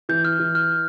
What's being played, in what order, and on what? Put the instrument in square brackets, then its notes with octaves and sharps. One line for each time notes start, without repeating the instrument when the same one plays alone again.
[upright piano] E3 [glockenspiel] G6
[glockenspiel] F6
[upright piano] E3
[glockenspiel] F6